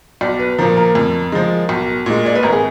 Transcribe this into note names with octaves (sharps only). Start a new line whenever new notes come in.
B1 D5
B4
A#2 F3 A#4
A#4
F2
F3 G#3
B1
A#2 G#3
D5
B4
G#1 A#4
G#4